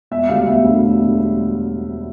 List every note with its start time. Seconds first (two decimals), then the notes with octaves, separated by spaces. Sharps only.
0.11 E1 E5
0.29 D2 D3 G3 F5
0.46 E1 E5
0.64 D2 D3 G3
0.82 E1
1.00 D3 G3